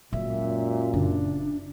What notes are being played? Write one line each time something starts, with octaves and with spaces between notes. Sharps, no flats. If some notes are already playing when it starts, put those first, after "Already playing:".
F#2 A#2 G#3 E5
F#1 D4